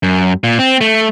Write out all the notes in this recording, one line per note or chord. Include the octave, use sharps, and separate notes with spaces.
F#2
A#2
C4
A3